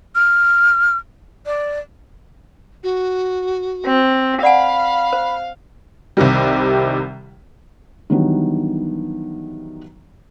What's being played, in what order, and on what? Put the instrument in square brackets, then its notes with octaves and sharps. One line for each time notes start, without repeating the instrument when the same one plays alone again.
[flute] F6
D5
[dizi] F#4
[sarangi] C4
[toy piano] D5 F#5 G#5 [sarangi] F5 [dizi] B5
[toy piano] C5
[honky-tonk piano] C2 C3 D#3 G3
[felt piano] D#3 E3 F#3 G3 B3 D4